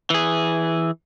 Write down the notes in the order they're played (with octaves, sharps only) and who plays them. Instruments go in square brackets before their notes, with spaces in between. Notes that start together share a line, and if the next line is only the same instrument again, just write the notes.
[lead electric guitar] E3 G#4